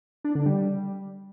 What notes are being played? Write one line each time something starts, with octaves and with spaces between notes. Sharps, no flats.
D4
D3
G3